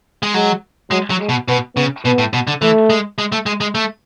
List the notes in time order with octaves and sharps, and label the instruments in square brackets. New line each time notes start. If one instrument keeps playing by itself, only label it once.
[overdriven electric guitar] G#3
[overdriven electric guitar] F#3 [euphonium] G#3
[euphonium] F#3 [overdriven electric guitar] G#3
[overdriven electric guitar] F#3
[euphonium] G#3
[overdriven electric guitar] B2
[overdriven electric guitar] B2 [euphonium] B3
[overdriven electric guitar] C#3 [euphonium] B3
[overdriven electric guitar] B2 [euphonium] B3
[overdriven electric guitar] A2
B2
D3
[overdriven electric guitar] E3 [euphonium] A3
[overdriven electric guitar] G#3
G#3
A3
G#3
G#3
A3